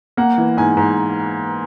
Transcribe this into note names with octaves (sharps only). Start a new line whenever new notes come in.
A#3 F#5
E3
G#2 G#5
G#2